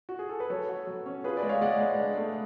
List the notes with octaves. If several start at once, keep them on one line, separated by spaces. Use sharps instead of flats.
F#4
G#4
A4
B4
F#3 A4 C#5
F#4
F#3
C#4
F4 G#4 B4
B4 D5
G#3
C#5 F5
G#3 D5 F#5
G#3
D4
A3